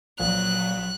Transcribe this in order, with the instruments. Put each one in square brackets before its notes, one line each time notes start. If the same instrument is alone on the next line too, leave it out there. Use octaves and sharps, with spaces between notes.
[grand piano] A#1 [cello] F#3 [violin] F#6